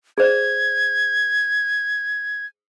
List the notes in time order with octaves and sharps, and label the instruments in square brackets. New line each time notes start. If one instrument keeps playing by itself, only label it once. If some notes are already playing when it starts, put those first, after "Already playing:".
[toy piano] G#4 C5 D5 [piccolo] G#6